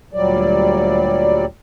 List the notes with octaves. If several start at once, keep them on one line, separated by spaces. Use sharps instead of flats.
D2 A#2 F#3 G3 D5